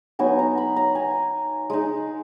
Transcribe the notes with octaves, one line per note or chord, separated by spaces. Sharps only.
F#3 B3 D#4 G#5
A#5
B5
A#5
G#5
G#3 D#4